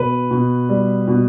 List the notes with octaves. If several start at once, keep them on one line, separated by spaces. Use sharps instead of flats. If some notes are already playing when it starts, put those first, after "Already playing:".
Already playing: B2 B4
B2
G3
B2